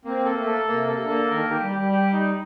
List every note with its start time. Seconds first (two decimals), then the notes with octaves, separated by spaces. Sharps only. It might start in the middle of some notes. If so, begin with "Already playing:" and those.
0.05 A#3 C4
0.25 A4
0.36 A3
0.46 A4
0.68 C3 A#3
0.88 A4
0.99 D3
1.09 A#3
1.30 D#3 A#4
1.45 D#3
1.50 G4
1.61 G3
1.72 G3 G4
1.92 G4
2.13 D#4